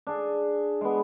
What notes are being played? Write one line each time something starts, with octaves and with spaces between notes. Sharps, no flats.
D4 G#4
G#3 B3